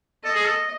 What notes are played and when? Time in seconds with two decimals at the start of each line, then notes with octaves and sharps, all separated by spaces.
0.24 A4 D#5
0.35 G#4
0.45 A4